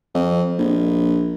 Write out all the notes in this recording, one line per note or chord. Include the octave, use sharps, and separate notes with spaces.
F2
A#1